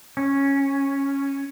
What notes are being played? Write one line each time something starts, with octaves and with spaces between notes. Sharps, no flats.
C#4